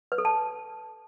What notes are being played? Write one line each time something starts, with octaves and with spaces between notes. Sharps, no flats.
B4
A4
A5